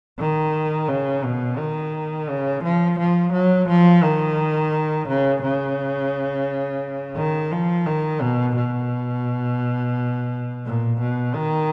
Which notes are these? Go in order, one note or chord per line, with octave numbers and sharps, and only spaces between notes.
D#3
C#3
B2
D#3
C#3
F3
F3
F#3
F3
D#3
C#3
C#3
D#3
F3
D#3
B2
B2
A#2
B2
D#3